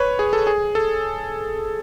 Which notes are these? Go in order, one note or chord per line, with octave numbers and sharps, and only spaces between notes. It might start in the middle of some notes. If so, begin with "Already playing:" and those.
Already playing: B4 C#5
G#4
A4
G#4
A4